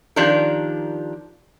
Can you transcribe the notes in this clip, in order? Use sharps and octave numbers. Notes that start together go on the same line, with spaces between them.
D#3 F3 D4 G4 A#4